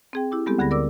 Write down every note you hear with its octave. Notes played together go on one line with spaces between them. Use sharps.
C4 G#4 G5
E4 G4 D6
G3 G#3 B3 C4 G4 A4
D2 D3 G#4 B5 A#6
A#4 D5 D6 E6